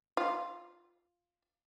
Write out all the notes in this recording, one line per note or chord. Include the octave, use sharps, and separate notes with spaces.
F4